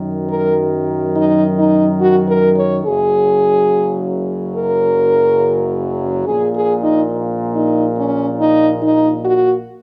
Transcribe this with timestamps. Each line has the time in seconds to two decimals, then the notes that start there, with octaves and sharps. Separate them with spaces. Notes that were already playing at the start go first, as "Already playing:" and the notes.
Already playing: F#2 D#3 F#3
0.30 A#4
1.16 D#4
1.58 D#4
2.01 F#4
2.29 A#4
2.58 C#5
2.86 F#1 F#2 C#3 F#3 G#4
4.57 A#4
6.27 A#1 A#2 A#3 G#4
6.56 G#4
6.84 D#4
7.55 D#4
7.97 C#4
8.40 D#4
8.83 D#4
9.25 F#4